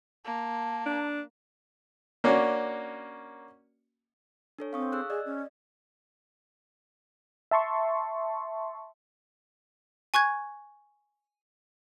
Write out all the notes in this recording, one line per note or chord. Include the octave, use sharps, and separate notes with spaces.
A#3 A5
D4
A#3 C#4 D4 F#4
D4 A4 C#5
C4 F5 C#6 D#6
G#4 E6 F#6
G#4 D5 D#5
C#4
E5 A5 C6 C#6
G#5 C#6 F#6 G#6